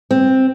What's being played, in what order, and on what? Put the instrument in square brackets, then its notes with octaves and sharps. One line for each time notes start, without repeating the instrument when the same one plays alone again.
[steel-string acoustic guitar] C4